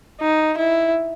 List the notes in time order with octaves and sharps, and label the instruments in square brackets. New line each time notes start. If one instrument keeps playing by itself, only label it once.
[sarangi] D#4
E4